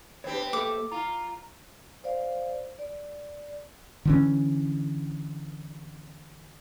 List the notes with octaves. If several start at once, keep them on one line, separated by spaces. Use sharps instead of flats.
B3 C4 D4 G4 C#5
A#3 A4 D6
F4 A#5
C5 D5 F5
D5
D3 E3 C#4